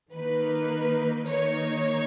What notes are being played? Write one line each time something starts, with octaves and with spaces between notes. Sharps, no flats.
D#3 A#3 D#4 B4
D#3 A#3 D#4 C#5